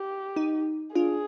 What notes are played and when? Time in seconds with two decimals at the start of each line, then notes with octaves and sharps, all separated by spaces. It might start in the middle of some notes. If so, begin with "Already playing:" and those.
Already playing: G4
0.36 D#4
0.95 D4 F4 G#4